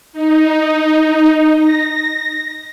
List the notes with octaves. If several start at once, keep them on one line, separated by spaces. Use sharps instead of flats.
D#4
A#6